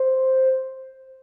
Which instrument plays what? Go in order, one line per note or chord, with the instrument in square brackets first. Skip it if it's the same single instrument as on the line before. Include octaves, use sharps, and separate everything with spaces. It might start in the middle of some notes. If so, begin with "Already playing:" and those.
Already playing: [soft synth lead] C5